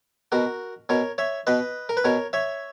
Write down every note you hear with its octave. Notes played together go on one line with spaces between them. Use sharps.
B2 F#4 A#4
B2 A#4 C#5
C#5 E5
B2 B4 D#5
A#4
B4
B2 A#4 C#5
C#5 E5